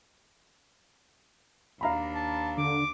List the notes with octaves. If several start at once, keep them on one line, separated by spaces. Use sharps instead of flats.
D#2 D4 F5 A#5 B5
A5
D3 D6